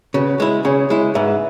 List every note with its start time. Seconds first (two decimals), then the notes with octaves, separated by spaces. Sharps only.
0.14 C#3 F#4 B4
0.40 G#3 E4
0.65 C#3 G#4 C#5
0.90 G#3 E4
1.15 G#2 B4 E5